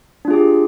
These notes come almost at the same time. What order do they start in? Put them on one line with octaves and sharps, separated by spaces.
D4 F4 G#4 G4